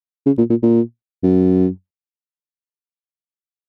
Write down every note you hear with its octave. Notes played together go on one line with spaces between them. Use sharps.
C#3
A#2
A#2
A#2
F#2